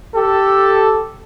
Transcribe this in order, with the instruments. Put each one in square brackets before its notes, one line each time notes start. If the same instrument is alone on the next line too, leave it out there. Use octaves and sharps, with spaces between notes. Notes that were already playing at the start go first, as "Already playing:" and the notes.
[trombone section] G4 A4